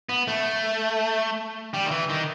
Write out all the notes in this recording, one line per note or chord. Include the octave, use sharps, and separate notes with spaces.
B3
A3
G3
D#3
E3
D#3